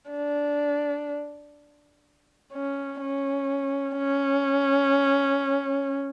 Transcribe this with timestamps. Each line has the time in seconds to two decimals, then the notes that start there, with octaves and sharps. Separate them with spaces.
0.10 D4
2.53 C#4
3.01 C#4
3.98 C#4